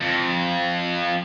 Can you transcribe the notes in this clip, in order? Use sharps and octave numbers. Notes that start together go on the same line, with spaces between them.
F2